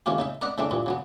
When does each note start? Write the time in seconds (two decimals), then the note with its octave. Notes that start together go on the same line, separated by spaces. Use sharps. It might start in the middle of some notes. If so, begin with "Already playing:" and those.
0.06 C3 D#3 A3 C#4 F4 G4
0.19 C#3 D#4 E5
0.42 A#4 D5 D#5 F#5 A#5 B5
0.58 C#3 E3 G#3 A3 C4 D4
0.71 G2 A#2 E3
0.86 C#3 F#3 B3